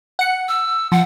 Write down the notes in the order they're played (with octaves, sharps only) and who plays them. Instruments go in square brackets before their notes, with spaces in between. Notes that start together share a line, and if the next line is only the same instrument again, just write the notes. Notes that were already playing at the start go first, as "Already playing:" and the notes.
[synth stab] F#5 C#7
[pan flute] E6
[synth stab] F3 [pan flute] F#5